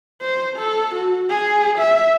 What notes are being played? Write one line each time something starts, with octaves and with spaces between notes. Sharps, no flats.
C5
A4
F#4
G#4
E5